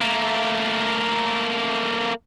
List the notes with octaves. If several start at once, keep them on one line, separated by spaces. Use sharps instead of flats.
A3 A#3